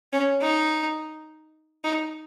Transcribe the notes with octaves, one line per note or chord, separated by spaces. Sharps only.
C#4
D#4
D#4